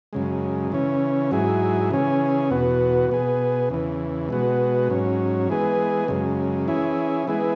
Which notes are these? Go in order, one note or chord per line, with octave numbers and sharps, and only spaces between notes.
F#2 C#3 G#3
C#3 E3 C#4
G#2 F#3 E4 G#4
C#3 E3 C#4 G#4
E2 B2 B3 F#4
B2 B3 G#4
E2 C#3 E3
B2 G#3 B3 F#4
G#2 F#3 C#4
E3 G#3 B3 G#4
F#2 C#3 G#3
E3 C#4 E4 G#4
E3 G#3 B3 E4 G#4